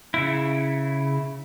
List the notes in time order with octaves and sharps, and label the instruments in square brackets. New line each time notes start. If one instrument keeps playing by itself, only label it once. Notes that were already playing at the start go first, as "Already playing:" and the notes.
[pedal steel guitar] C#3 E4